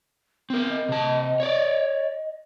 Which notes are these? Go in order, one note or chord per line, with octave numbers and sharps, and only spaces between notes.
B3 C4 A#4
D#5
C3 A5
C#5 D5